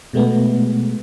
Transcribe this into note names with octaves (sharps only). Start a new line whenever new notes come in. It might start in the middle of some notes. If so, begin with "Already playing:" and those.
B2 G#3 A3 B3